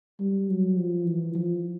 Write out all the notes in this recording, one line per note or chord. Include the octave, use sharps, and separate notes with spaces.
G3
F#3
F3
E3
F3